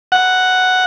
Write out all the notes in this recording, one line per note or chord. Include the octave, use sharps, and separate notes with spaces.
F#5